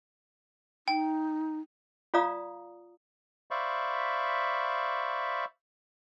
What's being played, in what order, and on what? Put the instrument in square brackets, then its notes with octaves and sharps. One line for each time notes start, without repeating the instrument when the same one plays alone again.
[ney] D#4 [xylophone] G5
[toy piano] F4 D5 F5 A#5 D#6
[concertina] C5 D5 E5 F5 B5 C#6